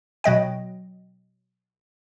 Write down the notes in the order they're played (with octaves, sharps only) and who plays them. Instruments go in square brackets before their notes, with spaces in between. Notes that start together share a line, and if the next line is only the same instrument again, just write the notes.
[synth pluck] B2 F#3 D#5 G5